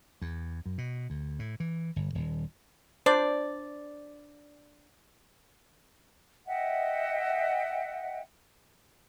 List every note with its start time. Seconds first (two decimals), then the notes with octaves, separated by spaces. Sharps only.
0.22 E2
0.66 F#2
0.78 B2
1.10 D2
1.39 A2
1.60 E3
1.96 G1
2.15 D#1
3.06 D4 C5 D5
6.47 D#5 E5 F#5 G5